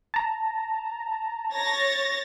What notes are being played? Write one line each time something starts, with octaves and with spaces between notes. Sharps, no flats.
A5 A#5
C#5 A6 A#6